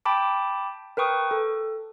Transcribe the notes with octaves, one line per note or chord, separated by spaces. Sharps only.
G5 A5 B5 D6
A#4 B4 G5 C#6 D#6
A4